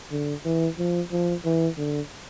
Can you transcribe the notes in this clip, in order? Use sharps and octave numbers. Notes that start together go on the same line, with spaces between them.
D3
E3
F3
F3
E3
D3